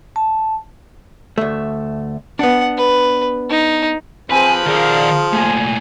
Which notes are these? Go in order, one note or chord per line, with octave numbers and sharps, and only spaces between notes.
A5
D2 A3
B3 D4 F#5
B4
D#4
F3 C4 G#4 B4 G#5
D#3 G#4 A#4 D5 F5
A#2 A3 G#5